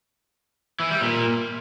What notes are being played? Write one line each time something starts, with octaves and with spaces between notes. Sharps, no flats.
E3
G3
A#2